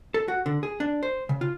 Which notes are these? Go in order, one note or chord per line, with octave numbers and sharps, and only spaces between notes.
A4
F#4
D3
G#4
D4
C5
C#3
F4